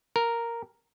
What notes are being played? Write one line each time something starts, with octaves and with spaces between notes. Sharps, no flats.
A#4